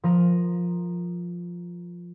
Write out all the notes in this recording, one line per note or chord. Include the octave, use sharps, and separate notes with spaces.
F3 A#4 D#7